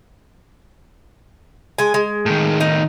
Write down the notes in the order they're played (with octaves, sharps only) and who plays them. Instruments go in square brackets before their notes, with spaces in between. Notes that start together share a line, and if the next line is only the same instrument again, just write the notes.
[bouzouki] G#3 G#5
G#3
[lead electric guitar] A2 D#3
[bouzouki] D#4